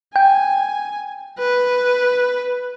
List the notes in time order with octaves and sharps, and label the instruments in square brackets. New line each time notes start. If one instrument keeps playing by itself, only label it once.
[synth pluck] G5 [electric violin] G#5
[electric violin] B4